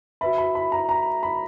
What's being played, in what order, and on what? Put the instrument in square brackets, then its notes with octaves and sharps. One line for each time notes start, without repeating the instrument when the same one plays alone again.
[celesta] F#4 B4 E5 [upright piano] B5
[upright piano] B5
B5
A#5
A#5
B5